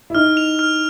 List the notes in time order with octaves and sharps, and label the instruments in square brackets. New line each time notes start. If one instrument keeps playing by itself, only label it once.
[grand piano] E4
[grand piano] D#4 [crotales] F6
[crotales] F7
F6